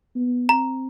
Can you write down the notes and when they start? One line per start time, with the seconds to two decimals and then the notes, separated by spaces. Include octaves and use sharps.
0.16 B3
0.49 C4 A#5